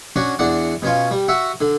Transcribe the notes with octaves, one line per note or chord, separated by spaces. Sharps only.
C#4 D4 F#4
E2 D4 D5 F#5
B2 C#4 F4
G3
F#4 E5 F#5
D3